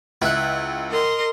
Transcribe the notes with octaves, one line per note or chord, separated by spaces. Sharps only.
C#2 E4 F#5
A#4 D#5 C6